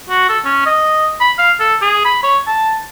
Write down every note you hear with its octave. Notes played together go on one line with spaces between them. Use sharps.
F#4
A4
C#4
D#5
B5
F5
A4
G#4
B5
C#5
A5